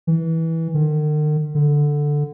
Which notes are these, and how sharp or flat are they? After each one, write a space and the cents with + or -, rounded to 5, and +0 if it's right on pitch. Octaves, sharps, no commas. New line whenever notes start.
E3 -15
D#3 -45
D3 +0